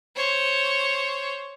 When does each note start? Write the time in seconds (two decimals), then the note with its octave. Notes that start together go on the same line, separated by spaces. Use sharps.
0.16 C5 C#5